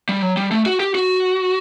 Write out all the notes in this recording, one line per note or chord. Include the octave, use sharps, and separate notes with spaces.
G3
F#3
G3
A3
F#4
G4
F#4